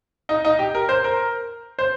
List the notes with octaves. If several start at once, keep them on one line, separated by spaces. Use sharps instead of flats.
D#4
D#4
G4
A#4
C5
A#4
C5